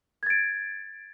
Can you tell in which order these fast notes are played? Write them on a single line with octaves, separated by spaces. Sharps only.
G#6 A6 D7